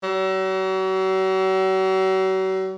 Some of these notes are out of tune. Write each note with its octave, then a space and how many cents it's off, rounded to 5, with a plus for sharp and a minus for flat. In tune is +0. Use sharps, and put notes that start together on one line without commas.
F#3 +40